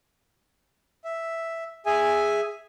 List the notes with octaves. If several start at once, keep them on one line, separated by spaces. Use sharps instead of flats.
E5
G#4 E5 G#5